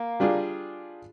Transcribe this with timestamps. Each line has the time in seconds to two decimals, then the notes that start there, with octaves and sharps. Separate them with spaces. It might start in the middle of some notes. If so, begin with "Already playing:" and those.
Already playing: A#3
0.20 G3 D4 F4 G#4